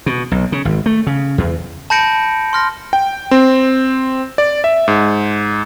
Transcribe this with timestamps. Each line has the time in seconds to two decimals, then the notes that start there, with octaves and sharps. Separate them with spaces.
0.06 B2
0.31 B1
0.52 C#3
0.65 G#1
0.86 A3
1.07 C#3
1.38 E2
1.90 A5 B5 G6 A#6 C#7 D7
2.53 C6 F6 A#6
2.93 G5
3.31 C4
4.38 D5
4.64 E5
4.88 G#2